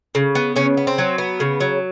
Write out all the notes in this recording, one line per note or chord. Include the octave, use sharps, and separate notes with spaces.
C#3
B3
C#3 C#4
B3
C4
F#3
B3
C#3
F#3